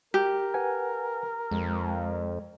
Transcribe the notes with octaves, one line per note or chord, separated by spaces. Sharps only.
G4 A#4
B4 F#5 G#5
F2 G#3